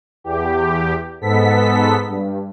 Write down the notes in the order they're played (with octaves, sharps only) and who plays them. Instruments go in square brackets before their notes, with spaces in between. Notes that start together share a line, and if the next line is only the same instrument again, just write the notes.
[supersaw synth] E2 G4
G#2 B3 A4 B6
G2